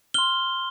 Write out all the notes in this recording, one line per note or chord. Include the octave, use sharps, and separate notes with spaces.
C6 F6 G7